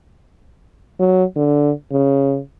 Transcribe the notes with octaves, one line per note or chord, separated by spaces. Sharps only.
F#3
D3
C#3